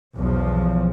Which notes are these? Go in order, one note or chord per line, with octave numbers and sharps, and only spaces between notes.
B1 E2 F3